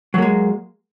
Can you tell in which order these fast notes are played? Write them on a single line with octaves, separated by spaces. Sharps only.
F#3 A#3 G#3